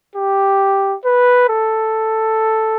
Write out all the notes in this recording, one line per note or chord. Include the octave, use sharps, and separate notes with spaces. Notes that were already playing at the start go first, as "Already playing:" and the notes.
G4
B4
A4